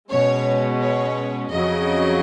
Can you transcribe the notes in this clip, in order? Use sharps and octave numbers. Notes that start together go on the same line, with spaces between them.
B2 G#3 C#4 C#5
C#5
F2 C#3 F#3 D#5